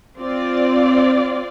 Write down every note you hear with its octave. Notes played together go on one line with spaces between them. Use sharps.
C4 F4 D5